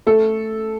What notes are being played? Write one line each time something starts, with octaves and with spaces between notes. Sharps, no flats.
A3 A4